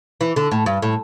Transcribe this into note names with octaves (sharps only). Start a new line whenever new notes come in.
E3
D3
A2
G2
A2